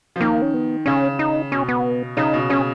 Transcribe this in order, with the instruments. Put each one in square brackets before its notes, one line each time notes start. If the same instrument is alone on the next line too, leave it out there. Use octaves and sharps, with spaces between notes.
[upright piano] F3
[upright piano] D#3 [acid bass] A#3
[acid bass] C#4
B3
[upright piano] C#3 [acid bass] C#4
[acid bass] D#4
[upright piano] B2 [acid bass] C#4
[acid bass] B3
[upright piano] C#3 [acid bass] D#4
[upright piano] B2
[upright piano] C#3 [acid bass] C#4